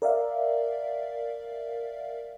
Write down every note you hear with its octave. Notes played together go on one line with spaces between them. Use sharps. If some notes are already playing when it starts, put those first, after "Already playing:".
A#4 D5 E5 F5